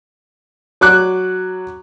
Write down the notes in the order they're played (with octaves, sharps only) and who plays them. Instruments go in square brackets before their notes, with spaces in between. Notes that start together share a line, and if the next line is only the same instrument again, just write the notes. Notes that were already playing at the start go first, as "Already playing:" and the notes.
[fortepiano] F#3 D6 F#6